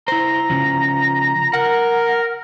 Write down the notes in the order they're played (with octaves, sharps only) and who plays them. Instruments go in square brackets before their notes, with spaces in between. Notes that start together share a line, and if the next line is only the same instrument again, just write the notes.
[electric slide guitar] E4 C5 [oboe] A#5
[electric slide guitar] C#3 F3
[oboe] A#4 [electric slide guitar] F#5